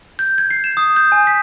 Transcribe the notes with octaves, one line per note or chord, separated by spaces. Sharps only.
G6
G#6
C7
E7
D#6
G6
G#5
B6